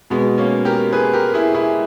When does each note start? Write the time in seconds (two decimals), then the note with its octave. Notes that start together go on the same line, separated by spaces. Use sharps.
0.10 B2 G#3 B3
0.38 A#3 C#4
0.65 G4 A#4
0.93 G#4 B4
1.13 G4 A#4
1.34 E4 G#4
1.54 E4 G#4